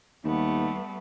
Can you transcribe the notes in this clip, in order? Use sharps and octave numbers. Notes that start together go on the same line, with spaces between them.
D#2 G3 A3 B3